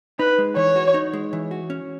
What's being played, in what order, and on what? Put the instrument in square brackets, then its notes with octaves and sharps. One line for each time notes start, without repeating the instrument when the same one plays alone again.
[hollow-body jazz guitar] D#4 [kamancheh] B4
[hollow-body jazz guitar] G#3
[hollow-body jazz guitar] E3 [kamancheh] C#5
[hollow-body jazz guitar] F#4
D#4
G#3
E3
F#4
C#4